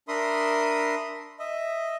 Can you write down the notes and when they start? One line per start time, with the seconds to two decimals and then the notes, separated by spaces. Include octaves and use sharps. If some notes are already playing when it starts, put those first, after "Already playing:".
0.08 D4 A#4 E5 B5 C6 D#6
1.39 D#5 E5